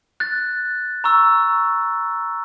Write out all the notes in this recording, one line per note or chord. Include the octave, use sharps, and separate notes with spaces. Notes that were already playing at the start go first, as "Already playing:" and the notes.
F#6 A6
A#5 C#6 E6